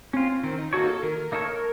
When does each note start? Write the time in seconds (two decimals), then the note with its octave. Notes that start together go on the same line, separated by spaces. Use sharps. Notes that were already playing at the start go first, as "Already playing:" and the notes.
0.13 C4 C#4 F4
0.43 D#3 C4
0.58 D#4
0.73 A#3 D#4 F#4 A4 C#5
0.88 A4
1.03 D#3 A#4
1.32 A#3 D#4 A4 C#5